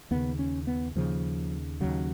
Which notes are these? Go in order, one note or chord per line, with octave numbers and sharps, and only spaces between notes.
D#2 C#3 B3
C#4
B3
D#2 C#3 F3
D#2 C#3 F#3